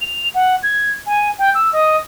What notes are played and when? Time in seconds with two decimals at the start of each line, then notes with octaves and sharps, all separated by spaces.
0.01 F7
0.34 F#5
0.63 G#6
1.06 G#5
1.38 G5
1.54 E6
1.72 D#5